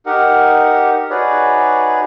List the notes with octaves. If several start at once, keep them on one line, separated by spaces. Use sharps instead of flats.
D#4 G4 A#4 F#5
D#4 F#4 G#4 B4 C#5 D5